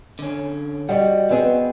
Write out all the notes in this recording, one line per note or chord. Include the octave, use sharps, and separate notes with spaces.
D3 C#4
G3 F#4 D#5 F#5
B3 C4 G#4